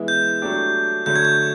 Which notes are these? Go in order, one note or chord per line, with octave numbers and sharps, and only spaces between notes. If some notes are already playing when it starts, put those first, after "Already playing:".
Already playing: E3 G#3 B3 E4
G6
F#3 A3 D4 G4
D3 F#3 A3 G6
G#6
G6